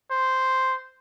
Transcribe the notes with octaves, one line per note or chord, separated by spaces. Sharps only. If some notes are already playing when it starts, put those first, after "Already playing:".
C5